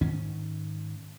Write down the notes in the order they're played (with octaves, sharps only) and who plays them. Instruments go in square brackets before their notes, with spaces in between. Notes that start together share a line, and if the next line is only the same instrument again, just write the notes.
[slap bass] G#2 D#3 C#4